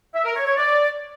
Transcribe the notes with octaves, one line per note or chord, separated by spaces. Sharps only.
E5
A#4
C#5
C#5
D5